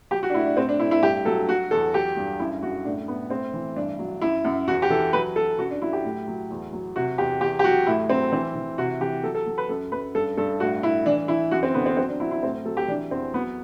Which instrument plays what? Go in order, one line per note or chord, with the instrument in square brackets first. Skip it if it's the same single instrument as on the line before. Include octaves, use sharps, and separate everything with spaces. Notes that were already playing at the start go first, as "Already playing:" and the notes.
[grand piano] F#3 G4
F#4
D4
A2 E4
D4
A2 C4
D4
A2 E4
E4
G2 G4
F#3 A4
F#3 F#4
E2 A4
F#3 G4
G2
F#2 E4
F#2 F#4
A2 D4
A2 B3
A2 C4
E3
G2 D4
F#3
F#2 E4
F#2
E2 F#4
G4
E3 A4
F#3 B4
F#3 A4
F#2 F#4
D4
F#3 E4
G4
A2
F#3
E2
F#3
C3 F#4
E2 G4
E2 G4
G4
F#3 F#4
A2 E4
F#3 C4
E3 C4
E3
C3 F#4
E3 G4
F#3 A4
A4
F#3
B4
F#2 A4
F#2 B4
G2 A4
G2 A4
A2 F#4
A2 E4
E3 D4
E3 E4
F#2 F#4
C4
D3 B3
C4
F#3 C4
D4
F#3 E4
E4
A2 C4
F#3 A4
G4
E3 D4
E2 C4
F#3 B3